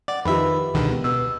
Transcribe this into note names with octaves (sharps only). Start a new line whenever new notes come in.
D5 F#5
F2 D#3 F4 G4 B4 E5 B5
E1 C#2 D3 D#3
B3
B2 B4 E6